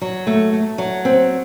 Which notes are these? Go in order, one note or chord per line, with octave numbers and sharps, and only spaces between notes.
F#3
A3
A3
F#3
C4